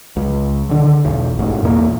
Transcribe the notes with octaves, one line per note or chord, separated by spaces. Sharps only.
C#2
D3 D#3
E1 B1
A1 G#2
E2 A#2 G#3 A#3